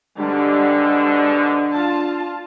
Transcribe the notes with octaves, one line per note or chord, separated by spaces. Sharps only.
G#2 B2 D3 G3 D4
F4 A5